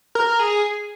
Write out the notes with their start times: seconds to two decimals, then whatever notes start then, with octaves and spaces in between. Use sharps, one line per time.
0.15 A#4
0.39 G#4